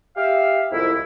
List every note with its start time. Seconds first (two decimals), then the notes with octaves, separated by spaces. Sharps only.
0.17 G4 E5 F5
0.71 C2 F2 G#2 E4